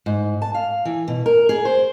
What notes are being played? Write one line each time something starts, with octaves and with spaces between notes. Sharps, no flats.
G#2
A5
F5
E3
B2
A#4
G#4
C5